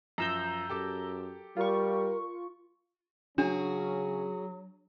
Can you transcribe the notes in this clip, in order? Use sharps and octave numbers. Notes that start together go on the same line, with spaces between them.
F#2 F3 A#5 E6 G6
F#2 G4 A4 D6
G3 F4 A#4 C#6
C#3 F#3 C#4 D4 F#4 G#4